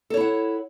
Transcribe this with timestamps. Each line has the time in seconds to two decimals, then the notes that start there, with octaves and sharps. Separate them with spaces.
0.10 A4
0.14 C#5
0.17 E4
0.21 F#5